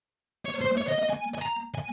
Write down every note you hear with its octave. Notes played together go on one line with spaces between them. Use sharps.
C#5
C5
C#5
D#5
D#5
G#5
G#5
A#5
G#5